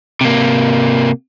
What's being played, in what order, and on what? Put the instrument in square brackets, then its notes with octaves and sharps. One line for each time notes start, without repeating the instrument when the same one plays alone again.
[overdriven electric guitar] C3 A#3